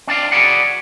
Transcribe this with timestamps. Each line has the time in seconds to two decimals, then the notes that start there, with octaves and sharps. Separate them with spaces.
0.07 C4 D4 D5 F5
0.32 F#4 G#4 B4 D5 F#5